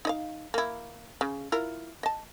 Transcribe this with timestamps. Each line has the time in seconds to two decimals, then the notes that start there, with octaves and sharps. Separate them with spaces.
0.05 D#4 D#5 F5
0.54 A#3 E4
1.21 C#3
1.52 E4 F4 A#4
2.03 D#5 A5